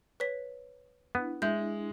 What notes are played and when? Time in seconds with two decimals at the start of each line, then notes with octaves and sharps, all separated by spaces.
0.20 B4 C#5 B6
1.15 B3 D4 E4
1.42 G#3 E5 G6